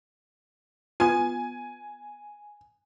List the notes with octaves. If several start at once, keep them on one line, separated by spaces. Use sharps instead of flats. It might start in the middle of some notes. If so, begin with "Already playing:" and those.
B3 F4 G#5